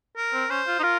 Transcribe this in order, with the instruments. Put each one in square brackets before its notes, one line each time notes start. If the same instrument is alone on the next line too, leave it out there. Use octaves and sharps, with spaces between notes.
[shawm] A#4
[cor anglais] C4
[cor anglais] C#4 [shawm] C5
[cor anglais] F4
D#4
[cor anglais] F4 [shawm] A#4